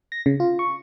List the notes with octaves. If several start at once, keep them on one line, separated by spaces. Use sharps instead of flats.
A#6
C#3
F4
C#6